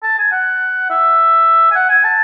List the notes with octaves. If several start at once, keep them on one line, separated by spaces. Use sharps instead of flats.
A5
G#5
F#5
E5
G#5
F#5
G#5
A5